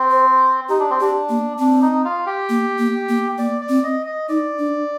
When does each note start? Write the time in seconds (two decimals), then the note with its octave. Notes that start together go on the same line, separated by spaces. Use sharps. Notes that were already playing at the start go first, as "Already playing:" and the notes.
Already playing: C4
0.10 C5
0.69 D#4 G4
0.80 D4
0.90 C4
1.00 D4 G4
1.30 A#3
1.59 C4 D4
1.82 D#4
2.05 F4
2.26 G4
2.49 A#3
2.79 A#3
3.09 A#3
3.38 A#3 D5
3.61 D5
3.69 C4
3.84 D#5
4.06 D#5
4.29 D#4 D5
4.59 D4